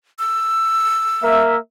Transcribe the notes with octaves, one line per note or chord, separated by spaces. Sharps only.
E6
A#3 A#4 E5